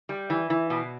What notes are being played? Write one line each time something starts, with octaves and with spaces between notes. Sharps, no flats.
G3
E3
E3
B2